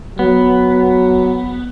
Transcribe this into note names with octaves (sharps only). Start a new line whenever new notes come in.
F#3 B3